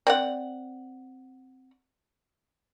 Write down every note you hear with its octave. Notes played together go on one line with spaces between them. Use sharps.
C4 D5 F#5